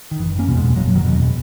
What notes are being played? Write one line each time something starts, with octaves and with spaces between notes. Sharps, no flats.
D#3
F#1 E3
A#3 C#4
E2 B2
G#3 B3
F#1 F#3 A#3
D#3 F#3
E2 B2